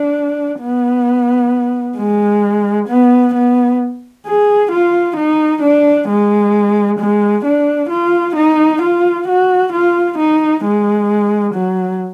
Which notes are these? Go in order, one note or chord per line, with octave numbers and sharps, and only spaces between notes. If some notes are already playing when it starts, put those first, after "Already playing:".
Already playing: D4
B3
G#3
B3
B3
G#4
F4
D#4
D4
G#3
G#3
D4
F4
D#4
F4
F#4
F4
D#4
G#3
F#3